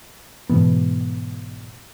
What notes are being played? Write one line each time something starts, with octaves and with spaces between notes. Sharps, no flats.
G#2 B2 E3 B3